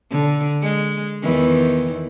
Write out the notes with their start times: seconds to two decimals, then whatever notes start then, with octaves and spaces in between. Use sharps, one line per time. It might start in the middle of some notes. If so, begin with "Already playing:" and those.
0.11 D3
0.62 G#3
1.23 E2 D#3 E3